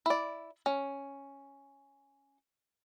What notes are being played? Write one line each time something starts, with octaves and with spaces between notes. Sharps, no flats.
E4 D5
C#4